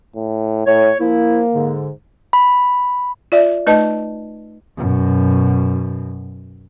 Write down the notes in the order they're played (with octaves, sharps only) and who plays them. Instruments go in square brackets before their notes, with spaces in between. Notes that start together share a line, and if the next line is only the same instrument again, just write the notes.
[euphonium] A2
[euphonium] A2 [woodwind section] C#5
[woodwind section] F3 E4 [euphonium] A#3
[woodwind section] G#2 D3
[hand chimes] B5
[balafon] F4 D5 E5
A3 D#4 B4 D#5 A5
[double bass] F#2 B2